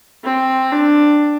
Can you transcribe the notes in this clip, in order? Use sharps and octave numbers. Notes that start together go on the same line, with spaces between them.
C4
D4